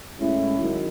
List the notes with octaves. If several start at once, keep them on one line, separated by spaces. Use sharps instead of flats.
A2 G#3 C#4 E4
D#3 F#3